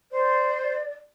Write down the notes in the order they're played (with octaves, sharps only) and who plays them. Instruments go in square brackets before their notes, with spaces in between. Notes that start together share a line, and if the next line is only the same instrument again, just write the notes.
[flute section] C5 [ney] D5